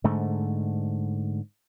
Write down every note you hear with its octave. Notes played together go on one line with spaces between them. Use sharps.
G#2 D3 A3